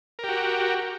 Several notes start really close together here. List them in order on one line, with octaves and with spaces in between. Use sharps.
A#4 G4 F#4